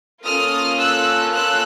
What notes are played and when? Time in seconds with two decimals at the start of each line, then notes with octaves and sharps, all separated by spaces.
0.24 A#3 C#4 F4 A4 D#6 F6
0.78 E6 F#6
1.33 E6 F#6